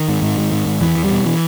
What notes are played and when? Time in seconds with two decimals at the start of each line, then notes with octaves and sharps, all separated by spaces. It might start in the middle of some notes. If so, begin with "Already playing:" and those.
Already playing: D#3
0.09 G#2
0.22 G#2
0.38 G#2
0.52 G#2
0.66 G#2
0.81 E2 E3
0.97 E2
1.04 G3
1.11 B2
1.26 E3